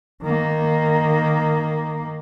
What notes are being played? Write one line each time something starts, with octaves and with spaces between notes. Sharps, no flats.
D#3 A#3